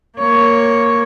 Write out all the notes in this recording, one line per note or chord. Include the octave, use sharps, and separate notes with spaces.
A#3 C#5